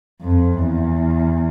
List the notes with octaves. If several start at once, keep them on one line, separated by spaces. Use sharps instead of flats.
F2
E2